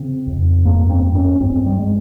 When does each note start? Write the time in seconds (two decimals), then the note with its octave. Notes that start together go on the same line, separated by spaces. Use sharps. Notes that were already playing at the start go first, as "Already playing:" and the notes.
Already playing: C#3 C4
0.27 F2
0.65 G2 A#3
0.89 C4
1.02 G2
1.15 C#4
1.40 G2 C4
1.66 G3
1.79 G#3